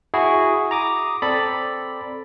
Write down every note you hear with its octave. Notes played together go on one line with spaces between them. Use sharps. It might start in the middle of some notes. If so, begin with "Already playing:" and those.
E4 F#4 G#4
A#5 D6 D#6
C4 A4 D5 B5